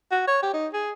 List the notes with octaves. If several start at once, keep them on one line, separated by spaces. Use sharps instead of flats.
F#4
C#5
G4
D#4
G#4